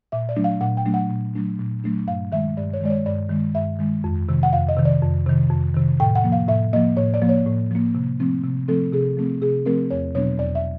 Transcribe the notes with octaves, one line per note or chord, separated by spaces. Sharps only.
A#2 E5
D5
F#3 A3 D4
F5
A#2 F#5
G5
F#3 A3 D4
F#5
A#2
F#3 A3 D4
A#2
F#3 A3 D4
G2 F5
D#3 G#3 E5
G2 D5
C#5
D#3 G#3 D5
C#5
G2 D5
D#3 G#3
G2 E5
D#3 G#3
F2
C3 D#3
F#5
F2 F5
D#5
C3 D#3
D5
F2
C3 D#3
F2
C3 D#3
A2 G5
F#5
F3 A#3
F5
A2 E5
F3 A#3 D#5
A2 C#5
D5
F3 A#3
C#5
A2
F3 A#3
C3
F3 A3 C4
C3
F3 A3 C4 A4
C3 G#4
F3 A3 C4
C3 G#4
F3 A3 C4 A#4
E2 C#5
B2 F#3 B3 D4 C#5
E2 D5
E5